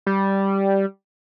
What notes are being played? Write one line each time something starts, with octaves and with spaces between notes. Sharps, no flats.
G3